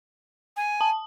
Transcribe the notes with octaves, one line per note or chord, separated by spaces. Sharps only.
G#5
A5